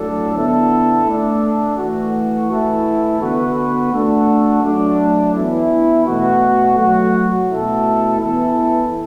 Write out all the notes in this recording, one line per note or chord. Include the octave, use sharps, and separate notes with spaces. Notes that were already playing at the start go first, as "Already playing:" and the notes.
Already playing: A2 F#3 D4 A4
D3 B3 E4 A4
A3 D4 A4
E3 A3 F#4
E3 A3 E4 A4
D3 B3 F#4 B4
A3 D4 F#4 A4
F#3 A3 D4
E3 B3 E4
B2 A3 F#4
F#3 A3 F#4
B2 A3 E4 A4
E3 B3 E4 A4